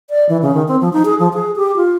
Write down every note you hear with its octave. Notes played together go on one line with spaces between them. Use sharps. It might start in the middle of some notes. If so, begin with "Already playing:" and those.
D5
E3
C#3
D#3
C4
F3
D#4
G#4
F3
G#4
G4
F4